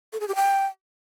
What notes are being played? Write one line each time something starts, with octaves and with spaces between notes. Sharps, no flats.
A4
G#4
G4
G5